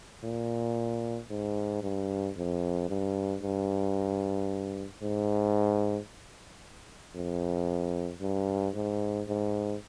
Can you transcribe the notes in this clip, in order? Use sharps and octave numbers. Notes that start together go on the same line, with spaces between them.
A#2
G#2
G2
F2
G2
G2
G#2
F2
G2
G#2
G#2